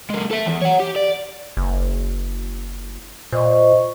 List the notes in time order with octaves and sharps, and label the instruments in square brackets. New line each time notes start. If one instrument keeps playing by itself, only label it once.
[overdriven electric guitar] G#3 A#3
A4 E5
E2
C#5 F#5
G4
D5
[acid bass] F#1
[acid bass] A#2 [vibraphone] C5 D#5 C#6